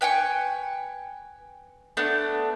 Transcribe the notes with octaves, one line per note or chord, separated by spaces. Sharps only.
B4 G5 G#5 C#6
A3 B3 D4